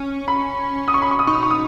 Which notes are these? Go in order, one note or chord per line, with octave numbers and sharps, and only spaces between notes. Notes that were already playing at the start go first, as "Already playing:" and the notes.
Already playing: C#4
B5
D#6
C#6
B5
C#6
D#6
D#4 C#6
D#6
C#6
D#6